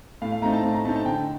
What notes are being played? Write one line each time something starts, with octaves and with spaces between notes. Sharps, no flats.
A2 F5
F5
A3 C4 D#4 A#5
A5
A2
A#5
A3 C4 D#4 A5
A5
D3 G5